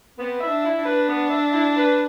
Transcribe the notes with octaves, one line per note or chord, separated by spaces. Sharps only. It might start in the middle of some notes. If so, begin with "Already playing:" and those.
B3 C4
E4 E5
D4
E4
D4
B4
B3
E5
E4
B4